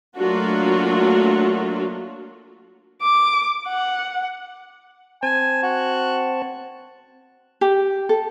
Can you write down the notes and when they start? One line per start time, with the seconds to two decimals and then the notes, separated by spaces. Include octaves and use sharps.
0.17 F#3 A3 A#3 D4 F4 F#4
3.02 D6
3.68 F#5
5.23 C4 C5 G#5 A5
5.63 F#4
7.61 G4
8.09 A4